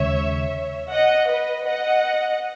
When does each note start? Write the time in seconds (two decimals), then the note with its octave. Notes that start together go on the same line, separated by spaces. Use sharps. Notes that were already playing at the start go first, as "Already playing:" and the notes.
Already playing: D#2 C#3 G#3 C#5 E5
0.90 D#5 F#5
1.29 B4 D#5
1.66 D#5 F#5